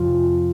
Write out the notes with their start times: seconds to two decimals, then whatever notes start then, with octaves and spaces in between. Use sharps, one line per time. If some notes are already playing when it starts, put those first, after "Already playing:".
Already playing: F2 C3 F3 F4